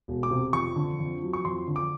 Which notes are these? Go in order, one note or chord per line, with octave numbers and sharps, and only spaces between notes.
E1
D6
C3
F2 C#6
D3
F2
F#3
C#6
F2 C6
D3
D6